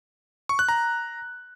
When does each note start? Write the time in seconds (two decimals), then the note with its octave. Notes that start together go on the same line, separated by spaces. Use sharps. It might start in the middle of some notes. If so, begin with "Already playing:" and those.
0.49 C#6
0.59 F#6
0.69 A#5